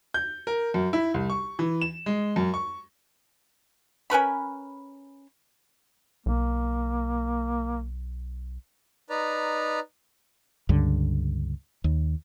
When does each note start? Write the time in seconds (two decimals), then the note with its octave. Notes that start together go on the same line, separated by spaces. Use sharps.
0.14 G6
0.47 A#4
0.74 F#2
0.93 E4
1.14 C2
1.30 C#6
1.59 E3
1.81 E7
2.06 G#3
2.36 F#2
2.54 C#6
4.10 C#4 A#4 B4 B5
6.26 B1 A#3
9.10 D#4 B4 D5 A#5
10.69 C#2 G2 D3
11.84 D#2